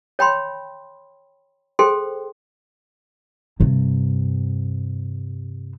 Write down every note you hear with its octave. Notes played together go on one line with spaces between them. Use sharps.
C#5 G5 B5 C6
G#4 A4 C5 G5 C6
G2 C3